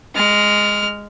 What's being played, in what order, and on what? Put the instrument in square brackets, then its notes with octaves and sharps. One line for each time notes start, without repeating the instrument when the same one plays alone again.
[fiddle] G#3 F6